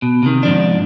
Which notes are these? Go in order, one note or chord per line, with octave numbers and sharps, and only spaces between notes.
B2
C3 D#3
G#2 F3 D4